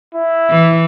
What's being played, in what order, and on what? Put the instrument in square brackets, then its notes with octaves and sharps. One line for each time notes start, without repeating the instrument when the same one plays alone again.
[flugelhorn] E4
[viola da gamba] E3